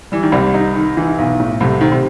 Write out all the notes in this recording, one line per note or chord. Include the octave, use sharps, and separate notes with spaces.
E3 G3
D#3
C2 C3 G3
D#4
D#3
E3
B1
A2
C2 C3 A3
D#3 C4
C3